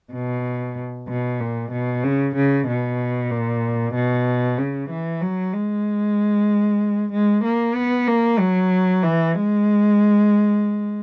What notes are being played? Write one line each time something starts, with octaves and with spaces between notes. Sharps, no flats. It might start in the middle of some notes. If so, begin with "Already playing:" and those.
B2
B2
A#2
B2
C#3
C#3
B2
A#2
B2
C#3
E3
F#3
G#3
G#3
A#3
B3
A#3
F#3
E3
G#3